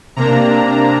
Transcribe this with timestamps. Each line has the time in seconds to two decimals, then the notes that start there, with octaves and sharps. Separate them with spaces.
0.17 C3 A#3 D4 A#5